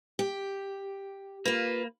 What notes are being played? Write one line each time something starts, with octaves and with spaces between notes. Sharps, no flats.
G4
A#3 F4 B4